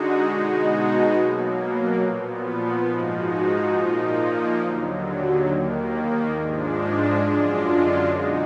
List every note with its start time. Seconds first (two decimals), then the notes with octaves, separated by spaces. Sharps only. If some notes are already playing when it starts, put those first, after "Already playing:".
Already playing: D3 G#3 D#4 F#4
0.27 B2 G#3 D#4 F#4
1.13 B2 F#3 A#3
2.00 A#2 F3 B3
2.86 G#2 F3 G#3 D#4 F#4
3.73 A#2 F3 A#3 D#4
4.59 D#2 D3 F#3
5.46 D#2 D#3 A#3
6.32 G#2 F3 G#3 D4
7.19 F#2 D3 G#3 D4 F4
8.06 B2 G#3 D#4 F#4